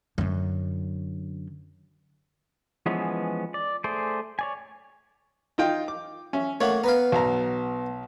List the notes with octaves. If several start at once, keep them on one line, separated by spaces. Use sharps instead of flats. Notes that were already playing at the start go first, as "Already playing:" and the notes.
F#2 D3
E3 F3 G#3 B3 C#4
D5
A3 G#4 C5 D5
C#5 D5 G#5
D#4 F4 G5
D6
C#4 E5
A3 A#3 C#5 F#5
B3 B4 F5 A#5
B1 A#5